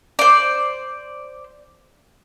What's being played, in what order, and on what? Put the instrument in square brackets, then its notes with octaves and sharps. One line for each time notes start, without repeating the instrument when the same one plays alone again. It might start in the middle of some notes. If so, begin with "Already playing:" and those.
[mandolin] C5 D5